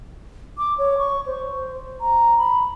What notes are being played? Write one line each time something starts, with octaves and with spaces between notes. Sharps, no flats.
D6
C#5
C#6
C5
A#5
B5